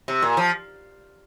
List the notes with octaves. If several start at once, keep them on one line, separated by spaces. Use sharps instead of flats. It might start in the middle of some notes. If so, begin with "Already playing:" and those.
C3
A#2
F3